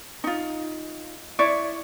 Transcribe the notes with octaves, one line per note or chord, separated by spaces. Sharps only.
D#4 F4
E4 C#5 D5